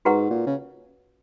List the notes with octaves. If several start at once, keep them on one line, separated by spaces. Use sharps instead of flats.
G#2 F#4 B4 F#5 A#5 C#6
A#2
C#3